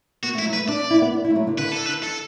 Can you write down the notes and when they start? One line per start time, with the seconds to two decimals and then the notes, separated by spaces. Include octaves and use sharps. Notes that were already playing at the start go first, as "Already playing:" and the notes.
0.23 B3 F#4
0.35 A3
0.39 E4
0.46 F#3
0.53 B4
0.57 A3
0.68 D4 D5
0.79 D4
0.90 E4
1.02 B3
1.13 D4
1.25 E4
1.30 A3
1.36 F#3
1.47 D3
1.58 D3 B4
1.72 A4
1.86 B4
2.03 A4